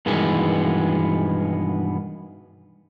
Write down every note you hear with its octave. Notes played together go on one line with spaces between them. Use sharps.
G2 B2 D#3 E3 G#3 B3